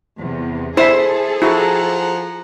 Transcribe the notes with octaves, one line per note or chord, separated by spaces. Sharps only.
E2 C3
E4 G#4 A4 C5 E5
F3 E4 F#4 F#5 A#5